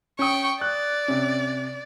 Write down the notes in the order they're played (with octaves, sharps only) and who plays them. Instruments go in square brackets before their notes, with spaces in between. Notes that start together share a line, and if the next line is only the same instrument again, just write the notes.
[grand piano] C#4 D#6 [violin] G5 C#6
[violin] D5 [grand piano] F#6
[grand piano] C3 C#4